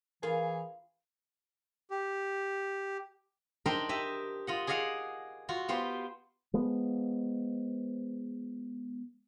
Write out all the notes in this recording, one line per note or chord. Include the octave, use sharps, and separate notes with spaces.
E3 F4 G#4 A#4
G4
D4 D#4 A#4 C5 E5 G5
G4 D#5 E5
F4 D#5 F#5
G#4 D5 D#5 F5 F#5
F4 F#4
B3 F4 G4 C5
F3 G#3 B3